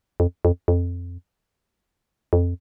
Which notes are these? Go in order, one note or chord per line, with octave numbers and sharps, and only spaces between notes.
F2
F2
F2
F2